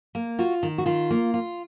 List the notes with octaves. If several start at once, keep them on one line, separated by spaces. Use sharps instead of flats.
A#3
F4 F#4
D#3
F#4
D#3 F4
A#3
F4